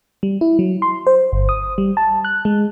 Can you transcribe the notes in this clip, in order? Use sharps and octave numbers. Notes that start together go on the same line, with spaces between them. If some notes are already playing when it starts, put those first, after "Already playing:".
G3
E4
F#3
C6
C5
G1
D#6
G3
A5
F#6
G#3